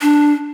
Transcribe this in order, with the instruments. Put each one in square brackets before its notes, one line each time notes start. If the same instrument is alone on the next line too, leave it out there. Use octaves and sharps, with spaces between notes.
[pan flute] D4